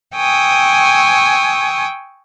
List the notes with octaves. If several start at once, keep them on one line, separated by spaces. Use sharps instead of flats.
G5 G#5 C#6 D#6 E6